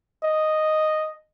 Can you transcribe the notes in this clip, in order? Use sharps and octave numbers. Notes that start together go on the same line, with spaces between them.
D#5